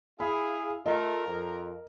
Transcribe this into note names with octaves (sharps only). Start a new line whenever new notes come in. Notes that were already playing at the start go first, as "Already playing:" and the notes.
E4 G#4 F5 B5
A3 F4 A#4 D#5
F2